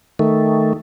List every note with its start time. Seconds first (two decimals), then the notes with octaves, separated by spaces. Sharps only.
0.19 D#3 A3